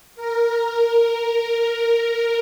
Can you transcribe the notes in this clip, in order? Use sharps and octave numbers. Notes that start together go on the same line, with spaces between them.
A#4